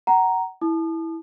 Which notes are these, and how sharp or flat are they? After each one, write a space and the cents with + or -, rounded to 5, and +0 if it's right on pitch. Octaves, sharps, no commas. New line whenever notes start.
F#5 +25 A#5 +0
E4 -10 A5 -25 D#6 -45